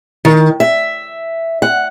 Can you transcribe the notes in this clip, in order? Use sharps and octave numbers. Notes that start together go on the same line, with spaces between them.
D#3
E5
F#5